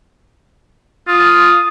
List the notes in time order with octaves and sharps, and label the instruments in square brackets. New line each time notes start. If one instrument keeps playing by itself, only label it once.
[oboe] F4 [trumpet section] D#6